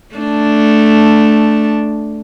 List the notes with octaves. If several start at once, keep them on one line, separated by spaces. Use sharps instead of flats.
A3 D4